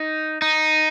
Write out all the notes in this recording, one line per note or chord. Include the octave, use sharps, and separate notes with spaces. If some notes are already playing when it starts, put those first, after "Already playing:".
Already playing: D#4
D#4